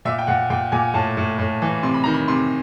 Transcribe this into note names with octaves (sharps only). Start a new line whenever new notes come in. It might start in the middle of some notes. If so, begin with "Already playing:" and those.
A#2 E5
G5
A#2 F#5
A#2 G5
A#2 G#5
A2 A5
A2
A2
E3
C3 C6
B5
D#3 A#5
B5
C3 C6